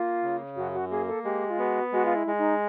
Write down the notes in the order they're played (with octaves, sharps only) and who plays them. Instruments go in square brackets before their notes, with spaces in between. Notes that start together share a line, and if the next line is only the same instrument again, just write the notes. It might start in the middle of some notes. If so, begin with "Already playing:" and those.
Already playing: [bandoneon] A#3 [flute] F4
[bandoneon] C#3
[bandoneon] F#2 [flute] F#4
[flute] F#4
[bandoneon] A#3 [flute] G#4
[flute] A4
[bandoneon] G#3 [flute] G4
[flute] F4
[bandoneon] B3 [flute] F#4
[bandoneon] G#3 [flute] F#4
[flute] F4
E4
[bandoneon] G#3
[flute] D#4